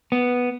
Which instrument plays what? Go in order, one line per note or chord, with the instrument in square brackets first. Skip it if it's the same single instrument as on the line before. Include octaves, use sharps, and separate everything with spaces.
[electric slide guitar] B3